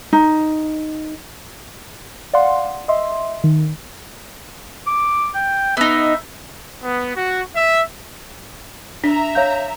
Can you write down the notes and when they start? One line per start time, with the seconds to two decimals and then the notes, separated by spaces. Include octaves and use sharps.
0.13 D#4
2.33 D5 F5 F#5 C6
2.88 D#5 E5 C6
3.44 D#3
4.87 D6
5.35 G5
5.77 B3 D#4 E5
6.83 B3
7.16 F#4
7.54 E5
9.04 D4 E5 A#5 B6
9.35 C#5 F5 G6